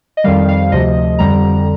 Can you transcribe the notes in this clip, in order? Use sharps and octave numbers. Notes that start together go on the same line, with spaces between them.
D#5
F2 D#3 G3 F5
F5
D2 C3 F3 D#5
F2 D3 G3 A#5